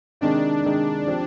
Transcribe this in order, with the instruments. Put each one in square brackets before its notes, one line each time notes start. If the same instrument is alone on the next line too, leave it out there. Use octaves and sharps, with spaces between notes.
[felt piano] C3 D#3 G#3 D#4 [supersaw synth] D4
[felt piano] C3 D#3 G#3 D#4
F3 C4 G4 D5